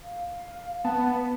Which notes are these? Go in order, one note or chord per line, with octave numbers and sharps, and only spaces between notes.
F5
B3 A5